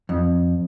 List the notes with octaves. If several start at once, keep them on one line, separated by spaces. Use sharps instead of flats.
F2